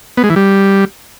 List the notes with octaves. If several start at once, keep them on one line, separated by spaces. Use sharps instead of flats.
B3
G#3
E3
G3